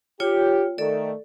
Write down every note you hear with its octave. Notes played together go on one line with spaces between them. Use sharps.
F4 G4 C#5 G5
D#3 A3 A4 D5